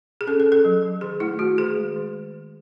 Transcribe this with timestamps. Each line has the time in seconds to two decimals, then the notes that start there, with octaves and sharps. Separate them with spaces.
0.21 G#4
0.27 C#4 A4
0.40 A4
0.46 C#4
0.52 A4
0.65 F#3
0.83 F#3
1.01 D#3 G#4
1.20 A3 E4
1.39 A3 F#4
1.58 D#3 G#4
1.77 G#3
1.96 D#3